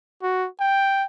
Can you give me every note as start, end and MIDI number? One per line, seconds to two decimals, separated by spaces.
0.22 0.48 66
0.60 1.05 79